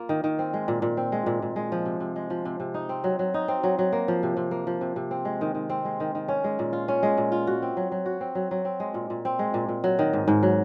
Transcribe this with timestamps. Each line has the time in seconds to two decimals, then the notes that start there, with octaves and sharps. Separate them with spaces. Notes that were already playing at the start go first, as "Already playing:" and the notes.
Already playing: A#3 F4
0.09 D#3
0.24 D#3
0.39 C4
0.54 G#3
0.68 A#2
0.82 A#2
0.97 C4
1.12 G#3
1.26 A#2
1.42 A#2
1.56 G#3
1.72 F3
1.85 C3
2.00 C3
2.16 G#3
2.30 F3
2.45 C3
2.60 C3
2.74 D#4
2.89 C4
3.04 F#3
3.19 F#3
3.34 D#4
3.48 C4
3.63 F#3
3.79 F#3
3.92 A#3
4.08 F3
4.23 C3
4.37 C3
4.51 A#3
4.67 F3
4.81 C3
4.96 C3
5.11 C4
5.25 G#3
5.41 D#3
5.55 D#3
5.70 C4
5.85 G#3
6.00 D#3
6.15 D#3
6.28 C#4
6.44 G#3
6.59 A#2
6.73 F4
6.88 C#4
7.03 G#3
7.18 A#2
7.32 F4
7.47 F#4
7.62 C4
7.77 F#3
7.92 F#3
8.06 F#4
8.21 C4
8.35 F#3
8.51 F#3
8.65 C4
8.80 G#3
8.94 A#2
9.10 A#2
9.25 C4
9.39 G#3
9.54 A#2
9.69 A#2
9.84 F#3
9.99 D#3
10.13 G#2
10.28 G#2
10.43 F#3